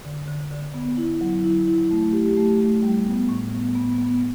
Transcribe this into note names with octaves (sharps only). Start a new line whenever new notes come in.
D3
D3
D3
B3
E4
F#3
E4
E4
A3
G4
A3
A3
G3
B3
A2
B3
B3
B3